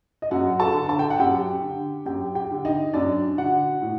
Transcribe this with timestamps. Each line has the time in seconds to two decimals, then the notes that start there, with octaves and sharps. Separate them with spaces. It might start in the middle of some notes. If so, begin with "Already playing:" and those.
0.22 D#5
0.31 F#2 F#4 F#5
0.60 A4 A5
0.74 D3
0.89 A5
0.99 G5
1.10 F#5
1.19 F#2 G4 G5
1.63 D3
2.06 F#2 G4 G5
2.35 G4 G5
2.51 D3
2.65 D#4 D#5
2.94 F#2 D4 D5
3.37 D3 F#4 F#5
3.82 A2